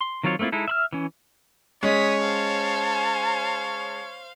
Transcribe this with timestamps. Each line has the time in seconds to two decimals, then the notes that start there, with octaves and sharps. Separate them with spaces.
0.01 C6
0.23 D#3 F#3 C4 F4 C#5
0.39 A3 A#3 C4 E4 F4
0.52 G#3 D#4 E4 A4
0.68 E5 B5 F6
0.93 E3 C#4
1.83 G#3 C#4 C#5 D#6 B6
2.22 C5 F5 A5